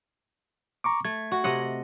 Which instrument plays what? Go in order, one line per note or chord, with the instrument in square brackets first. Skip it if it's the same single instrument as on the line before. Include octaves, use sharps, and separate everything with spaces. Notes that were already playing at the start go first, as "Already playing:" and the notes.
[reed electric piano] A#5 C#6 D6
[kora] A3 [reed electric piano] G#6
[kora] F#4
C3 D#5 F#5